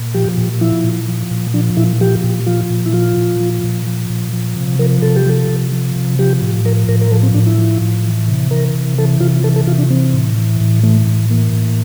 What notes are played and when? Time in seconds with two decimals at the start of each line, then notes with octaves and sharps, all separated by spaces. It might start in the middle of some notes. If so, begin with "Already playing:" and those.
Already playing: A#2
0.14 F3 G4
0.38 A#2
0.61 F3 E4
0.84 A#2
1.08 F3
1.31 A#2
1.54 F3 D4
1.77 A#2 E4
2.01 F3 G4
2.24 A#2
2.46 F3 F4
2.70 A#2
2.86 E4
2.93 F3 F4
3.17 A#2
3.40 F3
3.64 A#2
3.87 F3
4.10 A#2
4.33 F3
4.56 C3
4.79 F3 A#4
5.02 C3 A4
5.16 G4
5.26 F3 A4
5.49 C3
5.72 F3
5.96 C3
6.19 F3 G4
6.42 A2
6.65 F3 A#4
6.89 A2 A#4
7.01 A#4
7.12 F3 A4
7.23 C4
7.34 A2 D4
7.47 E4
7.58 F3
7.81 A2
8.05 E3
8.28 C3
8.51 E3 A#4
8.75 C3
8.98 E3 A4
9.20 C3 F4
9.44 E3 A4
9.56 A4
9.67 C3 F4
9.78 D4
9.90 E3 C4
10.14 A2
10.37 E3
10.61 A2
10.83 E3 A3
11.07 A2
11.30 E3 A#3
11.53 A2